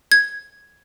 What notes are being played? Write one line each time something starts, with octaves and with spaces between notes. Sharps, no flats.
G#6